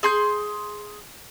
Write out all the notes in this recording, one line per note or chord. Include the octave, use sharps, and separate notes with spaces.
G#4 C6 G6